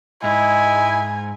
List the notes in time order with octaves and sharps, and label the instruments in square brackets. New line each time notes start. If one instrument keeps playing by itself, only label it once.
[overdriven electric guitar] G#2 [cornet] E4 [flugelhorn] D#5 [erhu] G#5